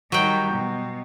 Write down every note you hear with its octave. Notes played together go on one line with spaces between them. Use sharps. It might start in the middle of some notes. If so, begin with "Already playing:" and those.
D#3 F#3 G3 G5
B2